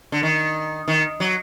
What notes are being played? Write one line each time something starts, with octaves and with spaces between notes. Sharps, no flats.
D3
D#3
D#3
F#3